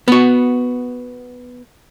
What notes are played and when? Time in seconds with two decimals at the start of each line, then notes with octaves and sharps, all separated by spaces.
0.08 B3 F#4